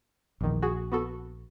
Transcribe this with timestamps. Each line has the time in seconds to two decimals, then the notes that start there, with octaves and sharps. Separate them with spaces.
0.41 A#1 E2 D#3
0.62 F#4 G#4
0.92 B3 F#4 A4